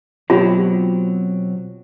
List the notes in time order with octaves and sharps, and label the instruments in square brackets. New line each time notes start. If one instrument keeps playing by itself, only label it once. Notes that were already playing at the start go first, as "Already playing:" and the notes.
[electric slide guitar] B2 F#3 C4 [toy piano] F4 [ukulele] G4 C#5 G5